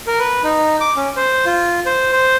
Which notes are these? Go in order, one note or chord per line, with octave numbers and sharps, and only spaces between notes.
A#4
B4
D#4
D6
C#4
C5
F4
C5
C5